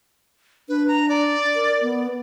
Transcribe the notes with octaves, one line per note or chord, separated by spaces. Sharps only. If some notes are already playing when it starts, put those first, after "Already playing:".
D4 B4
A#5
D5
A#4
B3